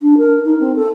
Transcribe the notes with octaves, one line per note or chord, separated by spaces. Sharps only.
D4
A#4
D#4
C4
A4